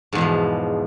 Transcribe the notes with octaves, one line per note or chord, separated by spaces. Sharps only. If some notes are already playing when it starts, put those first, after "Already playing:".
E2 G#2 B2 F3